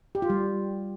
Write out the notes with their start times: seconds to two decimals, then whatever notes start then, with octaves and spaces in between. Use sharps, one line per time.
0.15 G4
0.22 F4
0.30 G3